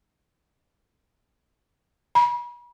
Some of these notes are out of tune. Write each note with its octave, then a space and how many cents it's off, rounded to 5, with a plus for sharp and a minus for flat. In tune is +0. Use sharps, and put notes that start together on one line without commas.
B5 -40